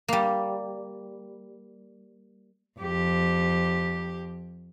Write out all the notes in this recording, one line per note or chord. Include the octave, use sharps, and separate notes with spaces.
G3 A#3
F2 G4